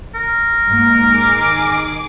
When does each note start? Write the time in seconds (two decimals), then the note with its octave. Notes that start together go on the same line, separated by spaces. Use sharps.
0.14 A#4
0.68 G#2 A#3
1.12 D#3 G#4 D6